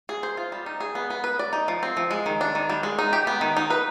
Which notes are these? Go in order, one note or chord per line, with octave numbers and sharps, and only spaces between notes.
G#4
C5
F4
G3
D#4
G#4
B3
B3
B4
D5
D#4
F3
C4
F3
G#3
D#3
D4
D#3
G3
G#3
D#4
G4
B3
D#3
D#4
B4